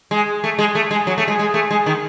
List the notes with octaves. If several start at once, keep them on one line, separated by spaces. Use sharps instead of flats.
G#3
A3
G#3
A3
G#3
F#3
A3
G#3
G#3
A3
G#3
D#3